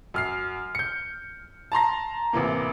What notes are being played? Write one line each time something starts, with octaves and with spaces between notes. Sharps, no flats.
F#2 F6 C7
G6 C#7
A5 A#5 C6 A#6
A1 C3 E3 A#3